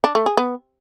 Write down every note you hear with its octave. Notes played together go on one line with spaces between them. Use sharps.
D4
A3
G#4
B3